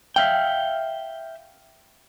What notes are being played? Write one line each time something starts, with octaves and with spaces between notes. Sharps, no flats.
E5 F5 G5